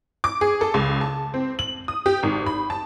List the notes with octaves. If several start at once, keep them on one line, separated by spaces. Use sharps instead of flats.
D6
G#4
A4
C#2
A5
C4
F#7
D#6
G4
G#1
B5
A5